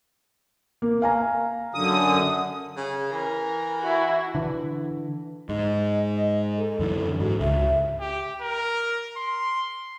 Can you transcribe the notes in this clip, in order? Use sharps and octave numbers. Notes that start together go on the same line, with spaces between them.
A#3
F5 G#5 A#5
F#2 D3 D#6
C#3
E3 A#4
E4 F#4
D3 E3
G#2 D#5
A4
F#2 D3 E3
G#2 F#4
C#2 E5
G4
A#4
C6